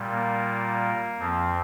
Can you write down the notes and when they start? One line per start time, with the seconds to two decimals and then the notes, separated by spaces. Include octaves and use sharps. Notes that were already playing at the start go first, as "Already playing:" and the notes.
Already playing: A#2 G3
0.11 A#3
1.19 F2 F3 C4